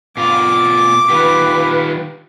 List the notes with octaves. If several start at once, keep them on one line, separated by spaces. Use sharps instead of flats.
B2 F4 D6
D#3 F4 G4 B4